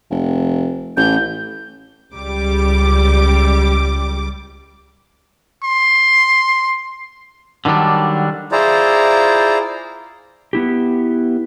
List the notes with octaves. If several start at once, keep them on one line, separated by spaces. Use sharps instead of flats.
F1
A1 G6
C#2 G3 D6
C6
D3 D#3 F#3 G3 D4
E4 F4 G#4 C5 D5 A#5
B3 E4 G4